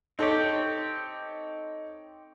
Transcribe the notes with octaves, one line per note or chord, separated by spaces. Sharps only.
C4 D#4 G4 A4 C#5